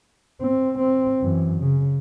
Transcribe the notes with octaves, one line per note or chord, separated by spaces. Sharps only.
C4
C4
F#2 E3
C#3